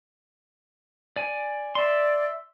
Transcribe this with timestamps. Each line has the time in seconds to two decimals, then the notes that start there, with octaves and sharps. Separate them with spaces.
1.16 D5 G#5
1.75 D5 E5 C6